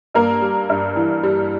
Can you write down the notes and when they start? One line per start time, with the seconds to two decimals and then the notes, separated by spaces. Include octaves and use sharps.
0.14 G2 A#3 A#4
0.42 G3
0.69 G2
0.96 E3
1.23 G3